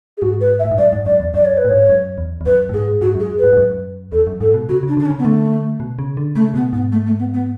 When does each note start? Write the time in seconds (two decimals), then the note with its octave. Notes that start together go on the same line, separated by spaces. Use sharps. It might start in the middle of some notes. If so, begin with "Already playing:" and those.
0.17 G#4
0.22 G#2 F#4
0.41 B4
0.59 E5
0.65 A2
0.71 G#2
0.78 F#2 D5
0.93 G#2
1.06 F#2 D5
1.20 E2
1.34 F#2 D5
1.45 C#5
1.58 B4
1.65 A2
1.69 G#2 C#5
1.89 F#2
2.18 E2
2.41 E2
2.46 F#2 B4
2.69 A2
2.74 G#2 G#4
3.01 G#2 F#4
3.15 F#2
3.20 G#4
3.39 G#2 B4
3.53 G#2
3.57 F#2
4.12 E2 A4
4.27 F#2
4.41 G#2 A4
4.54 B2
4.69 C#3 F#4
4.83 C#3 D4
4.97 D3 D4
5.06 C#4
5.11 C#3
5.19 B3
5.25 D3 A3
5.80 B2
5.99 C#3
6.17 D3
6.35 C#3 A3
6.54 B2 B3
6.73 G#2 B3
6.92 A3
7.06 A3
7.19 B3
7.34 B3